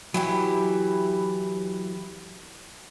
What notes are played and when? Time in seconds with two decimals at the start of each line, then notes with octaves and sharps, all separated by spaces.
0.14 E3 F#3 E4 G4